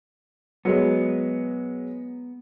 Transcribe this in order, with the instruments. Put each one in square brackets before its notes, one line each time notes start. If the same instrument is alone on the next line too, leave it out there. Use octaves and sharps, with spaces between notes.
[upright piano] F#3 G#3 [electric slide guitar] B3